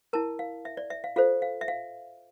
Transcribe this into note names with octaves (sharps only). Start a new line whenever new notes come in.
E4 A#4 A5
F5
E5
D5
E5
F5
F4 A4 C5 F5
F5
E5
F5